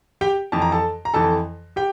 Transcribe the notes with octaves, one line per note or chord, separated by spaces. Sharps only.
G4 G5
F2 E3 A5
A#5
A4 A5
A#5
F2 E3 A4 A5
G4 G5